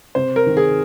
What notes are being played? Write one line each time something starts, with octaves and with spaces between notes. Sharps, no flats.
C3 C5
A#4
D#3
G#4